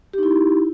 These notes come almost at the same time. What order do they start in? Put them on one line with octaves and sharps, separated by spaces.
G4 D#4 E4